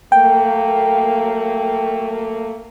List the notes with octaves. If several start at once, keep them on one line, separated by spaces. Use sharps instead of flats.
F#3 A3 A#3 G5